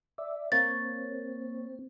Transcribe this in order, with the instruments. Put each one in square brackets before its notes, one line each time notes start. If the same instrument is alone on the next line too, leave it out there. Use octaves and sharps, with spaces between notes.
[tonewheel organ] D5 E5
[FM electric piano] A#3 C#5 [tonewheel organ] C4 [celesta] A6